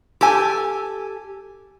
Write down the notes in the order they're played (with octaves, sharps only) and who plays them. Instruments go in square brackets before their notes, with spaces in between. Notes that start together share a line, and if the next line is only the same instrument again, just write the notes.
[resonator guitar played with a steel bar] G4 A4 G#5